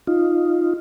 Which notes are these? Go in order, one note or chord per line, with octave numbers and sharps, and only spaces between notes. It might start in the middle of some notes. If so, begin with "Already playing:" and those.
D#4 F4